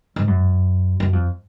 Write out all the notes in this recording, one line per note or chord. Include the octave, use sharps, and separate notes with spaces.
G#2
F#2
F#2
F2